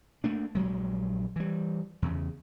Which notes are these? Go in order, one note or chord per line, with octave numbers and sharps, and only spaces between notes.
A3 A#3 D4
A#1 G2 F#3 G#3
E3 G3
E2 C#3